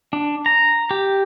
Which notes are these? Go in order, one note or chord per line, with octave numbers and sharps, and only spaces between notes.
D4
A#5
G4